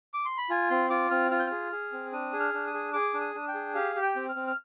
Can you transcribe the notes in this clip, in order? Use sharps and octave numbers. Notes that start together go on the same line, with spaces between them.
D6
C6
B5
F4 G#5
C4 C6
F4 D6
C4 F6
F4 F6
G6
G#4 F6
G#4
C4
D4 D#6
G#4
F6
D4
D#6
G#4
G#4 D6
D4
D#6
D4
G5
G#4
G4 F5
G4
G5
C4
F6
C4
F6